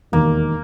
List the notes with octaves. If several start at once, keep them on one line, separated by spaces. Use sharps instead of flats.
E1 D#2 D#3 A#3